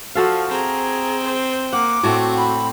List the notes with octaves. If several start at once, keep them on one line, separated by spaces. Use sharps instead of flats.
F3 F#4 A4 F5
C4 G#4 A#5
C5
A#3 F#5 D6
A2 A3 C4 F#4
B5